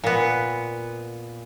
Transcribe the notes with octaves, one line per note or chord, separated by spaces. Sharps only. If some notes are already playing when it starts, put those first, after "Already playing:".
A#2 B3